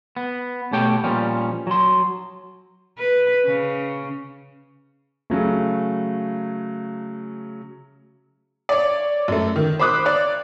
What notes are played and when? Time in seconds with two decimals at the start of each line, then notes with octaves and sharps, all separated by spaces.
0.17 B3
0.73 B2 A3 G4 C#5 G5
1.04 A#2 F3 G3 C#4
1.67 F#3 C6
2.98 B4
3.46 C#3
5.30 C#3 F#3 A3
8.69 C#5 D5
9.28 F#2 A3
9.56 D#3
9.80 C5 B5 D6 D#6 F#6
10.05 C#5 D5